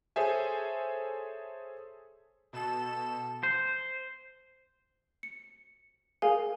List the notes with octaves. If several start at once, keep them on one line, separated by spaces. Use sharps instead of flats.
G#4 A4 C5 C#5 E5 G#5
B2 A4 E7
C5
C#7
G#4 A#4 F5 G#5